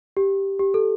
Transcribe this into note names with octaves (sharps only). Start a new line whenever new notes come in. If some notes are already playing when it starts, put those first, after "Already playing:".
G4
G4
A4